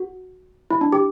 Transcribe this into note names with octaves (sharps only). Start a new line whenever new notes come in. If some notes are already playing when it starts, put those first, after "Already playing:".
Already playing: F#4
E4
D4
G4